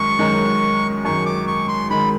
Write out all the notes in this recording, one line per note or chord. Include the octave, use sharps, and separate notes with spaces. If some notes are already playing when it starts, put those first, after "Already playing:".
Already playing: F#2 D#3 G#3 C#6
F#2 D#3 G#3
F#2 D#3 G#3 C#6
D6
C#6
C6
D#3 G#3 B5